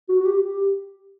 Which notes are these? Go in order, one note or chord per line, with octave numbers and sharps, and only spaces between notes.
F#4
F#4
G4
G4